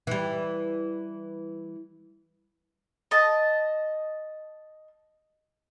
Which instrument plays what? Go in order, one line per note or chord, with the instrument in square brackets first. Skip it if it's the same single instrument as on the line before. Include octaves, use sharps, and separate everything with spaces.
[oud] E3 G3
[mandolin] D#5 A5